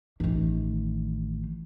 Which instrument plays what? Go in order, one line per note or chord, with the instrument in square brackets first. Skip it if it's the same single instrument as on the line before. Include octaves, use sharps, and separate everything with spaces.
[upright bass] A1 D#3